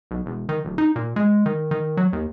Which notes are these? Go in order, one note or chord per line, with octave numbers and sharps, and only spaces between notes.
B1
E1
D#3
D1
D#4
A#2
G#3
D#3
D#3
F#3
D#2